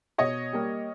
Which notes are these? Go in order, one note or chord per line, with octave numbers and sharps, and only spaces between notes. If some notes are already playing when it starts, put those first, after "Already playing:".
B2 C#5 D#5
G3 A#3